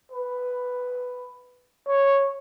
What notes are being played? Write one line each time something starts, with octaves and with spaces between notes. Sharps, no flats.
B4
C#5